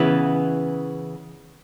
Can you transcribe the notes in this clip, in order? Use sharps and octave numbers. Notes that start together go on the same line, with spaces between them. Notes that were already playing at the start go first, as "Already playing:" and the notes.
Already playing: C#3 E3 B3